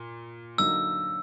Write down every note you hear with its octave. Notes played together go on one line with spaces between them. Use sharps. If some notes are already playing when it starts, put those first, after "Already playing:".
Already playing: A#2
D3 F#3 A#3 D#4 E6